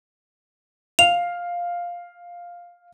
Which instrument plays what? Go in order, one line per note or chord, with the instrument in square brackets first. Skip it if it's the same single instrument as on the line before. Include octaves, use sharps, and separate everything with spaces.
[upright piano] F5 [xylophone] F7